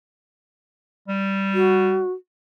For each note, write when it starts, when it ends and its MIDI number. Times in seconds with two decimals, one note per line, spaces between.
1.08 2.02 55
1.54 2.11 66